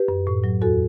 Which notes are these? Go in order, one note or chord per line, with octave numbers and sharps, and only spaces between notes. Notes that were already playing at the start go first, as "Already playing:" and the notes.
Already playing: G4 B4
F#2
A2
F#3
E2 F#4 A4